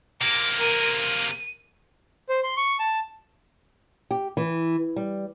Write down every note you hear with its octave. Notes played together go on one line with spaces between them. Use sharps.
C3 A#3 D6
A#4 D#7
D#7
C5
C6
C#6
A5
G4
E3
G3